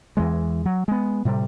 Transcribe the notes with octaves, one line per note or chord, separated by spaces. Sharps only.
E2 E3 G#3
F#3
G#3 B3
A2 C3 G3